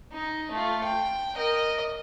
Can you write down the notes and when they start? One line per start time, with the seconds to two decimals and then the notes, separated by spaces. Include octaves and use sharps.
0.13 D#4
0.52 A3 F4
0.84 G5
1.36 A#4 D#5